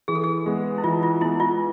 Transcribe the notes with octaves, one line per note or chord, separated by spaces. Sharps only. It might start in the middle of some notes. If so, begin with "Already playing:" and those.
E3 G#4
A4
G#4
G#3 B3
E4
E3 F4
F4
G#3 B3 E4
F4